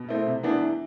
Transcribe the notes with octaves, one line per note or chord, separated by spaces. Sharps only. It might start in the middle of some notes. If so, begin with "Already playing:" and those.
Already playing: B2
A3 C4 E4
C3
E3 B3 D4
E3